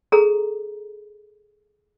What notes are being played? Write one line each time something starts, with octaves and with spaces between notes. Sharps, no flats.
G#4 A4 A#5